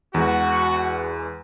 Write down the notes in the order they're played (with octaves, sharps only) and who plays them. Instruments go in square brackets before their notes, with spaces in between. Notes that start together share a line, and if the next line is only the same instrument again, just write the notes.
[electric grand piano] E2 E3 G#3 [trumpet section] F#4